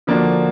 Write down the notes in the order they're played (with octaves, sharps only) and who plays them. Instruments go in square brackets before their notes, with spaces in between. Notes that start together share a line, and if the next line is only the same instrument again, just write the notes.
[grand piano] D3 F3 A#3 D4 F#4